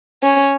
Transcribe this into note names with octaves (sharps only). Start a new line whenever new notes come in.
C#4